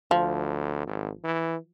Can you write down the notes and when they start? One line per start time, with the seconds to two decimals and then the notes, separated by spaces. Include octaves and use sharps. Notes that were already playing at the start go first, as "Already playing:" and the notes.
0.11 D2 F3
0.87 G#1
1.24 E3